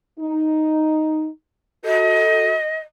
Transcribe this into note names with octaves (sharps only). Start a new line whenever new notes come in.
D#4
F#4 A4 D#5